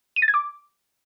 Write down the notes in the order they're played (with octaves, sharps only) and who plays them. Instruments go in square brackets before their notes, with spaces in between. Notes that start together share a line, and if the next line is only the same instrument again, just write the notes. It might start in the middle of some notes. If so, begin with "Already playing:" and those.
[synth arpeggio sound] D#7
A6
G#6
D6